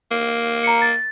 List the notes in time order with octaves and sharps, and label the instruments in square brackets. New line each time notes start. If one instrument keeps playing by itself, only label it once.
[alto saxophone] A#3
[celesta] A#5 C#7
A6